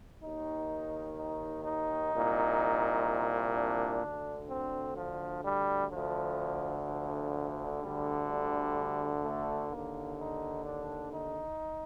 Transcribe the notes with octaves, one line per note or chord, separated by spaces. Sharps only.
D#2 D#3 D#4
D#4
D#4
C2 A#2
D4
D2 D3
C4
F3
G3
D2 D3 F3
F3
D2 D3 G3
G3
A3
D#2 D3 A#3
D#4
D4
D#4